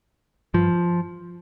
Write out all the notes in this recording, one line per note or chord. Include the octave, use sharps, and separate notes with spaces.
G2 F3